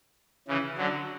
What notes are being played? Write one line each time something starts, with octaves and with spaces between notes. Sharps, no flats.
C#3 E3
D3 F#3